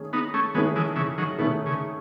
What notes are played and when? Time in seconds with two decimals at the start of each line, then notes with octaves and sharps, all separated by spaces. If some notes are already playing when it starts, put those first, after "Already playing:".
Already playing: D#3 A3 C#4 G#4
0.13 B3 D#4
0.34 A3 C#4
0.55 D#3 G#3 A3 B3 C#4 G#4
0.76 E3 G#3
0.96 C#3 E3
1.18 D#3 F#3
1.39 B2 D#3 A3 C#4 G#4
1.66 C#3